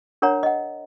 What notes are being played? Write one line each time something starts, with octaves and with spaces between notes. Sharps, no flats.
D4 A#4 C#5 F#5 A#5
D#5 F#5